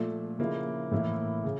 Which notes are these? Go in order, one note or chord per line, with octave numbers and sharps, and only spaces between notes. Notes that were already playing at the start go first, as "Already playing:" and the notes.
Already playing: A#2 F3 A3
C#3 F3 A#3 E4
A2 E3 A#3 E4
C#3